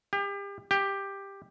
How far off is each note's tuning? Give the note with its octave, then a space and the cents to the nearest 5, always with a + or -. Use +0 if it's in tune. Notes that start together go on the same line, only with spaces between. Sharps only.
G4 +35
G4 +10